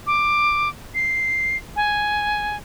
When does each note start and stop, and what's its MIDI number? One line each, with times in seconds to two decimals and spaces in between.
0.07 0.69 86
0.95 1.57 96
1.76 2.57 80